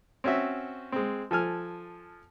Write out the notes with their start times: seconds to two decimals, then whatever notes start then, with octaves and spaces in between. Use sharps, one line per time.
0.24 C4 C#4 F#4 E5
0.92 G#3 C4
1.31 F3 A4 G#5 F6